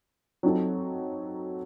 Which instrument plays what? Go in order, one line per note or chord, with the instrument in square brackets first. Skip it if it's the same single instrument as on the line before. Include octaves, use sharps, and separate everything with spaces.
[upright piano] F#3 C4 D#4 A4